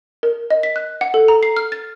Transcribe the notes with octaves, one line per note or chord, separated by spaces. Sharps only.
A#4
D#5
B6
F#6
F#5
A4
A#5
C7
F6
A6